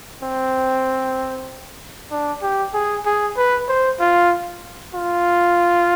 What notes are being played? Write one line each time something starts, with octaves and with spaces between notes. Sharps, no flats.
C4
D4
G4
G#4
G#4
B4
C5
F4
F4